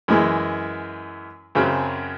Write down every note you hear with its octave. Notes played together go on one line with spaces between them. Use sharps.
F#2 E3 G#3
F#2 C#3 F#3 C4